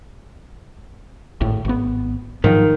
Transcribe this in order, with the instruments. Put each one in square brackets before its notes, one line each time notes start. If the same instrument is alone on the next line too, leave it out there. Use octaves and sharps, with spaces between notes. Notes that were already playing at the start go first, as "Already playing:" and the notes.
[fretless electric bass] G#1 A2
G#1 B3
[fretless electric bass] G#2 F3 F#3 [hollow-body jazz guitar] D#3